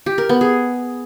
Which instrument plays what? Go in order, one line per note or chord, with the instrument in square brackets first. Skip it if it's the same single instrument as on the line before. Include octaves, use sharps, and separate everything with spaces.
[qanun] G4
A#4
B3
G#4